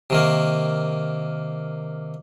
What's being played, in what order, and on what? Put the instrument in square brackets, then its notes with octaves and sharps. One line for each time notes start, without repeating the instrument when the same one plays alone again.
[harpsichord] C3 D#3 A#3